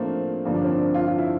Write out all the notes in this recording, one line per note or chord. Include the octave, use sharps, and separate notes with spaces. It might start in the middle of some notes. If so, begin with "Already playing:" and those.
Already playing: F3 A3 A#3 C4 D4
G2 D3 F3 A#3
D4
C4
D4
F4
F4
E4